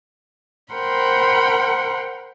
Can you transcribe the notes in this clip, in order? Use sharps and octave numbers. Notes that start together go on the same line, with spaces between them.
A#4 C5 F#5 G5 B5 C6